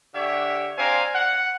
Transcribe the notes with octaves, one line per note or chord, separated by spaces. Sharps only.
D3 D4 G4 C#5 E5
C4 D4 C5 F5 G#5 A#5
F#5